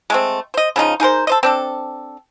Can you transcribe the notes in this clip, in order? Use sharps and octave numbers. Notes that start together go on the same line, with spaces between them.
G#3 A3 C4
C5 D#5
C#3 F3 D#4 F4
D#4 G#4 A#4 C5
A4 C5 D#5
C4 D4 A4